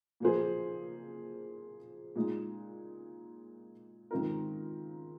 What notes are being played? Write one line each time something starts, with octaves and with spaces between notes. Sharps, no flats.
A#2 F3 A#3 G#4 C5
A#2 G#3 D#4
G#2 D#3 C4 F4 A#4